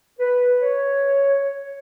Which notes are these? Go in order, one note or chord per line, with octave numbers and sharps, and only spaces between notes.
B4
C#5